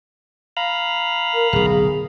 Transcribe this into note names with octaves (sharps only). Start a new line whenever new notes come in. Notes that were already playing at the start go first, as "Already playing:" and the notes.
F5 A#5 B5
A#4
D1 B1 G#4